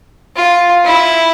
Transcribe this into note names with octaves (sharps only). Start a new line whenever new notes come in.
F4
E4